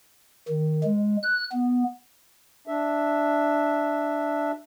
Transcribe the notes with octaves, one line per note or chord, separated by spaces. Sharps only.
D#3
G#3
F#6
B3
D4 E5